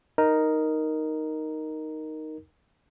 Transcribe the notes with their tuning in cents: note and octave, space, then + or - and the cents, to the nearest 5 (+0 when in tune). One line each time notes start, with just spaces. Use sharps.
D#4 +0 A#4 +0